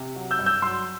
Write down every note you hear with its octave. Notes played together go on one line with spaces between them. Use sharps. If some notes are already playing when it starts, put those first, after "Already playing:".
Already playing: C3
F#3
E6 G6
G2
E6 G6
F#3 C6 E6